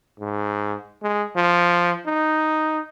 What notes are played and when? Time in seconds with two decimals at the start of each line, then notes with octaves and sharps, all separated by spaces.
0.20 G#2
1.03 G#3
1.36 F3
2.06 D#4